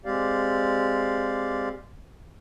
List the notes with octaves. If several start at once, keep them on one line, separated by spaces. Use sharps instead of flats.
G#3 C4 G4 D5 F5